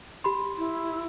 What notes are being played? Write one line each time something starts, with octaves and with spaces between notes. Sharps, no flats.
G4 B5 C6
E4